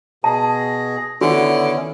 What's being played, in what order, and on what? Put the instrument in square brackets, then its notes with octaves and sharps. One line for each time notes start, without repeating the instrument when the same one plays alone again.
[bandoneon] B2 G#4 [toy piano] A5 [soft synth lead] A#6
[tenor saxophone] D3 [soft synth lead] D#3 [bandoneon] B3 C#4 E4 [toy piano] F#4